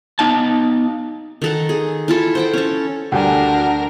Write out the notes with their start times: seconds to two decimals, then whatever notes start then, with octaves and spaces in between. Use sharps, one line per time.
0.19 B3 D#4 F5 A5
1.42 D#3 A4 F#5
1.69 G#4
2.08 E4 F4 A4
2.35 C5 F#5 G5
2.53 C#4 A4
3.12 D2 G3 D4 F#4 A4 A#4 F#5 G#5